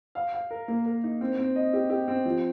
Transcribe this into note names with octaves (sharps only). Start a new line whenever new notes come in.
F5
F5
A#4
A#3
A#4
D#4
C4
C4
D#5
G4
G4
C4
F3